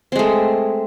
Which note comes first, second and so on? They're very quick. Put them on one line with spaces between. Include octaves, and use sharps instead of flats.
C4 G#3 A3